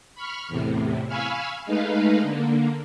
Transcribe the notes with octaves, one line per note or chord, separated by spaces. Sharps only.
B5 C#6 F6
E2 A2 C3
F5 G#5 B5 C#6 E6 F6
G#3 A3 D#4 B4 F5
D3 A#3